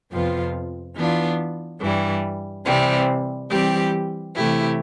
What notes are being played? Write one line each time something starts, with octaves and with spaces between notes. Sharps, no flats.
F2 C3 F3 B3 F4
E3 B3 D4 F4
G2 E3 G3
C3 E3 G3 C4
E3 G3 C4 G4
C3 E3 A3 E4 G4